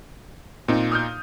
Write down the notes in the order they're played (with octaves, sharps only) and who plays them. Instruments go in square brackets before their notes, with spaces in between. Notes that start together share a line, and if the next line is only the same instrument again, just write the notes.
[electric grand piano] A#2 D#4 [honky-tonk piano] C4
[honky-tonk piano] D#6 F6 G6